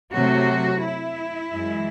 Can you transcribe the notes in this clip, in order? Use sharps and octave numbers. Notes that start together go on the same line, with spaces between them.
C3 F#3 A3 F#4
E4
F#2 E3 G#3